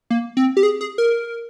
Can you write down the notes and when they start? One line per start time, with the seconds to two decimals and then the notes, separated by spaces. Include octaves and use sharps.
0.10 A#3
0.37 C4
0.57 G4
0.63 G#4
0.81 G#4
0.98 A#4